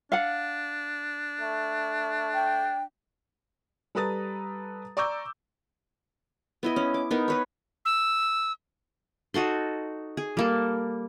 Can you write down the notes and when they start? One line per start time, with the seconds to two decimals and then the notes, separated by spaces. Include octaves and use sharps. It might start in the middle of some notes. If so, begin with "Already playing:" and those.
0.12 D4 F5 F#5
1.41 A3
2.34 G5
3.95 G3 A4 B4 A#5 D#6 A6
4.97 D5 A#5 C#6 D6 E6 G6
6.63 B3 E4 D#5
6.76 C#4
6.94 D6
7.11 B3 D#4 A#4
7.28 D#4 B4 C#5
7.85 E6
9.34 D#4 F#4 A4 C6
10.17 G#4
10.37 G3 A#3 A4